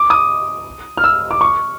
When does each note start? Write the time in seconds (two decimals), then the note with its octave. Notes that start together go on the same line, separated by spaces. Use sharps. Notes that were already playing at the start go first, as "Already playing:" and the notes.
Already playing: D6
0.10 D#6
0.97 F6
1.04 E6
1.31 D6
1.41 C#6